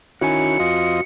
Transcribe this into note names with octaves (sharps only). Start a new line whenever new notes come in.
D#3 C#4 E4 F#4 G#5 C#7
F2 F4 D#5